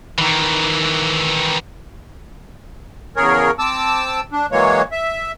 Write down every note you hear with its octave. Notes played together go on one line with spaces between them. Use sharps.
D#3 E3
E2 C#3 G#4 A#4 C#5
C4 A5 D6 E6
D4
E3 F#3 G#3 A#3 C#5
E5